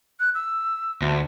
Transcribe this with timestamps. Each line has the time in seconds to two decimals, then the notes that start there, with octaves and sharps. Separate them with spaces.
0.20 F#6
0.35 E6
1.02 D2